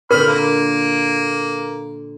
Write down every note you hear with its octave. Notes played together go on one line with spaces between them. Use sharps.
A#2 D3 A#4 G5 B5 F6
A#3